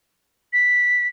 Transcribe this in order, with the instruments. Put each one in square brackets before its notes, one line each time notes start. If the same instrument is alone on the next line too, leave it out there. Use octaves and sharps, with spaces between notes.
[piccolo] B6